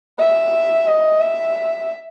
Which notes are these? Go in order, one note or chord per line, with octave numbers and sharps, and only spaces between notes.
E5
D#5
E5